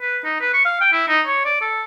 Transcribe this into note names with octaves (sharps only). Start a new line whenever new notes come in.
B4
D#4
B4
C#6
F5
G5
E4
D#4
C#5
D5
A4